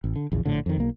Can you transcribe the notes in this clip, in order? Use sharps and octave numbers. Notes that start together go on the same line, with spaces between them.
A1
D3
A#1 E2 C#3
A#1 A2 D3
F2 D#3
B1 A#3